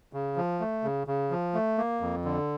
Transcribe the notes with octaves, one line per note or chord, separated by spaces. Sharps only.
C#3
F3
A3
C#3
C#3
F3
A3
A#3
F2
D3